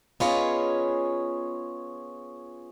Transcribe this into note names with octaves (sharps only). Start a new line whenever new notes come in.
B3 C#4 F4 G#4 C#5 D#5